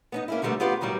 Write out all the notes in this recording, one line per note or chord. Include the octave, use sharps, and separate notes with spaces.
B3 C#4 D#4
A#3 C#4 E4
D3 D#3 F3 G3 A3 B3
B3 F4 G4 B4 F5
A2 D#3 F#3 G3